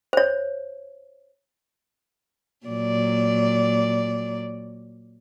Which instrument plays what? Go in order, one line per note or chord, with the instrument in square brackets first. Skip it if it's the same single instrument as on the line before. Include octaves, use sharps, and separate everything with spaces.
[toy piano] C5 C#5
[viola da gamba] A#2 F#3 D5